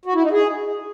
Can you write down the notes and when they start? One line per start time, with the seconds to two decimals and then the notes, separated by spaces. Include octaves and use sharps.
0.06 F#4
0.14 E4
0.23 D#4
0.32 G#4